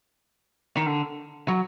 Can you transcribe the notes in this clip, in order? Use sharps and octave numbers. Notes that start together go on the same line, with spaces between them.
D#3
D3
F#3